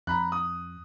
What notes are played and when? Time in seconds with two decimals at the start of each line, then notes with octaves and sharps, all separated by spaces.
0.07 F2 A#5 B5 F#6
0.32 D#6